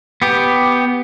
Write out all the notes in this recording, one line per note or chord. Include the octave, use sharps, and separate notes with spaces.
B3 G4